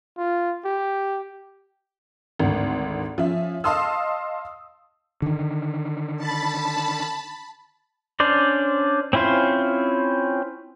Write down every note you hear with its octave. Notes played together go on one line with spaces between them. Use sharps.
F4
G4
G#1 D2
F3 C#4 E5
D#5 F5 A5 C6 D#6 E6
D3 D#3
A5 B5
C#4 D4 C5 D5
C4 C#4 E4 F4 C5